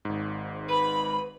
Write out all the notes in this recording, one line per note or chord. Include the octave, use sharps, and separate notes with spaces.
G#1 G#2
B4 B5